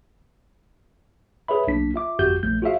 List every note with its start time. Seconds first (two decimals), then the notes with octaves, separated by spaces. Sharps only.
1.48 G#4 B4 C#5 E5 B5
1.67 B1 A#3 D4 B6
1.94 F4 E5 D6
2.19 G1 F2 F#4 G4 G6
2.43 A#1 A3 G6
2.62 F4 F#4 G#4 C#5 E5 F5